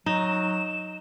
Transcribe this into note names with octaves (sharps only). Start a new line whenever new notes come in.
F#3 D#4 E7